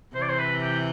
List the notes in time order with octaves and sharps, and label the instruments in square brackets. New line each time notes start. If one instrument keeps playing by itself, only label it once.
[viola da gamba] C3 E3 [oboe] C5
[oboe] D5
C5
B4
G4